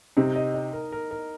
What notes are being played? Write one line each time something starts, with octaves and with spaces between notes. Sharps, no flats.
C3 C4 D#4
D#5
D#5
A#4
A#4
A#4